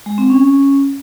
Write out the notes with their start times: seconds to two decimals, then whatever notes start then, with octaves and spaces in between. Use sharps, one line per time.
0.06 G#3
0.18 C4
0.30 C#4